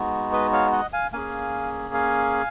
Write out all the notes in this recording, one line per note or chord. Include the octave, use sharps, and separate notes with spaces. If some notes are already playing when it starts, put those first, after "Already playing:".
Already playing: G#3 B3 D#4 F#4
B4 D#5
C#5 F5
D#5 F#5
F5 G#5
A#3 C#4 G#4 F5 G#5
F5 G#5